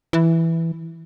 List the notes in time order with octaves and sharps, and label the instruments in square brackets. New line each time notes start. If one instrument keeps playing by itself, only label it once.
[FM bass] E3